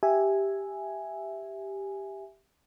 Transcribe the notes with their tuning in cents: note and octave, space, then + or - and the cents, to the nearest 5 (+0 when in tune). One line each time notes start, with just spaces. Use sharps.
G4 +0 E5 +0 G#5 +0